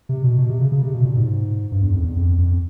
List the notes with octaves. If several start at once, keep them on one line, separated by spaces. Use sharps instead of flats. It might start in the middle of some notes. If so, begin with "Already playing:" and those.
C3
B2
B2
C3
C#3
C#3
C3
B2
A#2
G#2
G2
E2
F2
E2
F2
F2